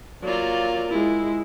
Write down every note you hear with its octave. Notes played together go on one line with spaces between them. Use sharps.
F#3 A#3 F4 D5
G#3 E4